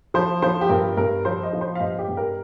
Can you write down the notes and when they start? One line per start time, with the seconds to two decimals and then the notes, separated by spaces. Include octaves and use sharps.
0.14 F3 C5
0.42 F3 C5
0.61 G4
0.69 G2 A#4
0.97 G2 A#4
1.25 F3 C5
1.43 D#5
1.53 F3
1.61 C5
1.75 F5
1.80 G2 D#5
1.99 G4
2.08 G2
2.17 A#4